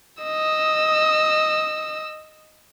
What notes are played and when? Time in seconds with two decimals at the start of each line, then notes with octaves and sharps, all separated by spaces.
0.23 D#5 E6